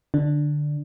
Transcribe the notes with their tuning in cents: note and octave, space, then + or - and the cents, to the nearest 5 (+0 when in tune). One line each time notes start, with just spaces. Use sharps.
D3 +10 D4 +0